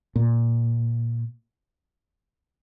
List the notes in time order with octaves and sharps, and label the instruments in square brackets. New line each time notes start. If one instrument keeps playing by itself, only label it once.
[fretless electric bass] A#2